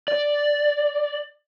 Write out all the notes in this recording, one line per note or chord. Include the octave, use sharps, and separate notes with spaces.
D5